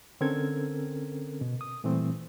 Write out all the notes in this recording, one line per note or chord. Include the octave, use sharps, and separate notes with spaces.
D3 C4 C#4 A4 A#4 G#6
B2
D#6
A#2 E3 G3 A3 C4